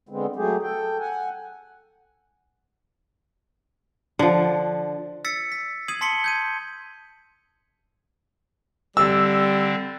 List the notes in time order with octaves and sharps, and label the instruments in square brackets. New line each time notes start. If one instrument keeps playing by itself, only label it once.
[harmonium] D3 G#3 B3 C4
F#3 A3 G4 G#4
A4 G5
F#5 G#5
[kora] D3 F3
[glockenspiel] E6 A6 B6 C#7
B6
D#6 G#6 C7 D#7 F#7
A5 C6 B6 C#7 G7
G6 G#6 D#7
[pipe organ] D3 C4 [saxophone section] G3 [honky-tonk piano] E6